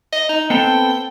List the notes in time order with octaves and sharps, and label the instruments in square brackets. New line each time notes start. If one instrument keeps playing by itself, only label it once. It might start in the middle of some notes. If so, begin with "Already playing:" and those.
[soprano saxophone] D#5
D#4
[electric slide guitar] B3 C4 A4 [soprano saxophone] G5